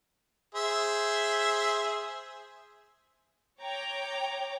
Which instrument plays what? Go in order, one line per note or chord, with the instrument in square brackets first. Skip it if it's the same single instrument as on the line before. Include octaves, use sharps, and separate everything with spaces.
[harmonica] G#4 C5 E5
[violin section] C#5 G5 A#5 D6